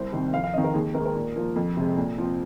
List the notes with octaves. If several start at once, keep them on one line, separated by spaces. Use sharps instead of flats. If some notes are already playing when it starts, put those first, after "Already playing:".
Already playing: C2 C5
C3 D#3 C4
F2 F5
F5
D#3 C4 D#5
A#4
D#2 G#4
D#3 G#3 A#4
A#4
A#2
F3 A#3
F2
C3 G#3 C4
A#2
F3 C4